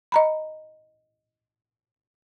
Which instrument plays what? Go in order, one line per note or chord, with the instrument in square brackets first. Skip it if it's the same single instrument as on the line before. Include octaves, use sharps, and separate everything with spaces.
[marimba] D#5 A#5 B5